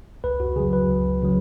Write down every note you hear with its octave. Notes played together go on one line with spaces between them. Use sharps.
C#2 B4
F#4
C#3 F#3 G#4
B4
C#2
C#3 F#3